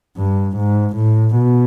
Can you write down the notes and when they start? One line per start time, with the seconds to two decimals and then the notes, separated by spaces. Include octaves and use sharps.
0.18 G2
0.57 G#2
0.96 A2
1.36 B2